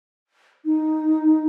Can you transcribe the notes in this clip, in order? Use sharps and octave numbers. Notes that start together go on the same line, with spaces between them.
D#4